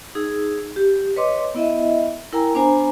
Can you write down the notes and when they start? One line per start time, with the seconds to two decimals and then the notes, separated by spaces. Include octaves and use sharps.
0.15 D#4 G#4 E6
0.76 G4
1.16 B4 C#5 D#5 C6 D6
1.55 B3 E4 D#5 E5
2.33 E4 A#4 G5 G#5 A#5 E6
2.55 B3 D4 C5 G#5 A#5